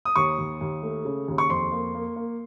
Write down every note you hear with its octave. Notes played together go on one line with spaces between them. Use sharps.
D#6
D#2 C#6
D#2
D#2
A3
C#3
D#2
C#6
F2 C6
A#3
A#3
A#3